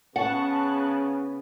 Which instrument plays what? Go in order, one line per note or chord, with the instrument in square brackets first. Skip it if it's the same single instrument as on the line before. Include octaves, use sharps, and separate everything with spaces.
[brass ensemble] C#3 B3 [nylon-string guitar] F#5 [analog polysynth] A5 C#6 F#6